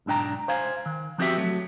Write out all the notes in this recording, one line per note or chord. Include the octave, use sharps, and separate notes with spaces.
B1 G#2 D4 G5 A#5
C5 F5 G#5
D#3
F3 B3 C4 F#4 G4 E5
F#3 A3